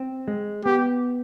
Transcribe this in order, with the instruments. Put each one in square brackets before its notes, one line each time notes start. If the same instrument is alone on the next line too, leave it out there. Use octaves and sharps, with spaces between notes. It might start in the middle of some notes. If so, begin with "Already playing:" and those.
Already playing: [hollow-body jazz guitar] C4
G#3
[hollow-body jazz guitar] B3 [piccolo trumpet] G4